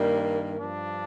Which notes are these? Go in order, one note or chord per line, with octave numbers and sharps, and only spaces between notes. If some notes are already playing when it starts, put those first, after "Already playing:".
Already playing: G2 D#3 G3 A#3
G2 F3 D4